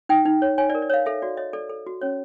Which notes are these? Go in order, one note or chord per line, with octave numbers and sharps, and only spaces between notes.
D#4 G5
D#4
C#5
C#5 G#5
D5
A#4
D5
C#5 F5
A4 E5
F#4 D5
C#5 D#5
A4 D5
A4
F#4
C#4 C#5